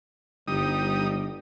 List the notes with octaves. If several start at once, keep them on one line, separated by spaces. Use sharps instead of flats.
G1 G3 D#4 D#6